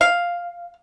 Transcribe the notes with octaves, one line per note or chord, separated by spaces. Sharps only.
F5